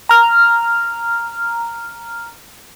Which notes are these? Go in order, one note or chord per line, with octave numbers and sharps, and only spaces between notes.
A#5 F6